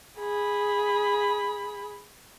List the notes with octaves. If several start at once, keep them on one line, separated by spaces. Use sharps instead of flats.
G#4 B5